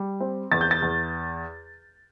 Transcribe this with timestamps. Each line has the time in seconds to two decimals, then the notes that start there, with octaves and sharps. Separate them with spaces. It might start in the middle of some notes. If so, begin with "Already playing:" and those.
Already playing: G3
0.20 C4
0.52 E2 A6
0.61 G6
0.71 A6
0.82 E2